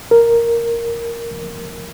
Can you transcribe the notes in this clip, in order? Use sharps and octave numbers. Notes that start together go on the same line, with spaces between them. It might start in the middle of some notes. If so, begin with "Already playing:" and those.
A#4